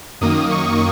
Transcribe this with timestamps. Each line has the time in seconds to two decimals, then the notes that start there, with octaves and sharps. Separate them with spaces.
0.21 F#2 D#3 A#3 D#6
0.51 C#6